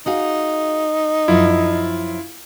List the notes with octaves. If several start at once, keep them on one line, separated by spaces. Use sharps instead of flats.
D#4 F#4 G#4 F5
F#2 F3 E4 F4 F5